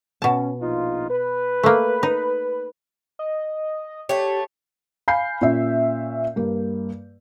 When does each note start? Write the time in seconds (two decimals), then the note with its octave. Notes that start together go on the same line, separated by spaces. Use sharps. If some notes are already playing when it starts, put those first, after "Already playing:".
0.22 B2 C#4 A5
0.61 A#1 D#4 F4
1.09 B4
1.63 A3 A#3
2.03 D#4
3.19 D#5
4.09 A3 G4 C#5
5.08 F5 G#5 B5 G6 C7
5.42 A#2 C#4 E5
6.36 G2 A#3